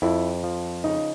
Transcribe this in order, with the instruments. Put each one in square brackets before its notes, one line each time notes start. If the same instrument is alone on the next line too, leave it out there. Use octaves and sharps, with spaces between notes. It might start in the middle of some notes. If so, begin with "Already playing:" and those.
[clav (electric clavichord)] F2 [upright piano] E4
[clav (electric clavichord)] F3
[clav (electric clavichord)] C#3 [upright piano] D#4